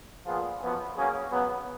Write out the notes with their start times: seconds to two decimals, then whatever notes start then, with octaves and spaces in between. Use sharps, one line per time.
0.26 A#2 F3 B3 F4 G#4
0.61 F#2 F3 B3 F#4
0.97 C#3 F#3 A#3 C#4 G#4
1.31 C#3 F#3 B3